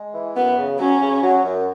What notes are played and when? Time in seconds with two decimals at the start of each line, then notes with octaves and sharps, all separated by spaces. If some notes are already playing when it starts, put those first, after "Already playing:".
Already playing: G#3
0.14 E3
0.36 F#2 B3
0.57 C#3
0.79 F#3 C#4
1.01 C#3
1.22 F#3
1.45 F#2